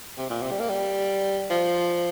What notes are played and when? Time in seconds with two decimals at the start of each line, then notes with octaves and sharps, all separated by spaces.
0.18 C3
0.30 A#2
0.42 C3
0.51 G3
0.60 A#3
0.69 G3
1.50 F3